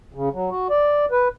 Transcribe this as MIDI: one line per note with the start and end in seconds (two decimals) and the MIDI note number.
0.14 0.29 49
0.33 0.50 54
0.51 0.68 66
0.70 1.05 74
1.11 1.28 71